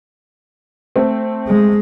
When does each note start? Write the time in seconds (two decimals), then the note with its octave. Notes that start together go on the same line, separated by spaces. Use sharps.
0.96 A3 C4
1.48 G#3